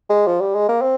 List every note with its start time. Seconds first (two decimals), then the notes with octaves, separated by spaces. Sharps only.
0.10 G#3
0.27 F3
0.40 G3
0.55 G#3
0.69 A#3
0.82 C4